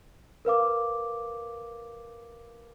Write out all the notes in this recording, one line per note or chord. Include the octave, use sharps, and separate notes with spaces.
A#4 B4 F5 D6